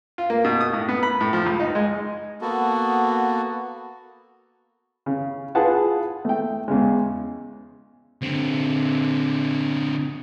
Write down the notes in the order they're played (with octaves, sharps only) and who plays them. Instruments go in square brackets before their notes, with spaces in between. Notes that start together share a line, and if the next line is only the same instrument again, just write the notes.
[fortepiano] F4
A#3
B2
D#6
A2
B3
B5
A2
F3
C#2
D#4
G#3
[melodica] A#3 B3 F#4 A4
[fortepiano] C#3
F4 G#4 B4 F#5 A5
A3 G5
E2 C#3 G#3
[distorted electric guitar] D3 C4